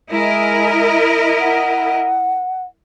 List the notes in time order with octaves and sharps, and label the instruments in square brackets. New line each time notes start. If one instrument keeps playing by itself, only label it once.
[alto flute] G#3 [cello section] E4 A#4 D#5
[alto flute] F#5